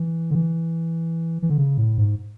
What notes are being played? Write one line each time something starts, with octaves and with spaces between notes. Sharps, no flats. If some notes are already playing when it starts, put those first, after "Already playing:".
Already playing: E3
D3
E3
E3
D3
C#3
A2
G#2